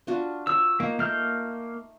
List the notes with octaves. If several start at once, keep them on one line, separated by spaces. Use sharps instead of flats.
D4 F4 F#4
C#5 E6
A#3 D#4
A3 A#3 F6 G6